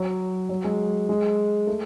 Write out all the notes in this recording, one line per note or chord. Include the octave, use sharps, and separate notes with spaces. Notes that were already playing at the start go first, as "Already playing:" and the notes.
Already playing: F#3
F#3
G#3
G#3
A3